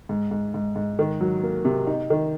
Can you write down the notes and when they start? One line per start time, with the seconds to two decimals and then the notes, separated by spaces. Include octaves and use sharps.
0.09 G#2
0.31 G#2
0.54 G#2
0.76 G#2
0.99 D#3
1.21 F#3
1.43 A#3
1.65 C3
1.87 D#4
2.10 D#3